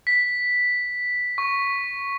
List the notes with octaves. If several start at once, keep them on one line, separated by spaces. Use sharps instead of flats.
B6
C#6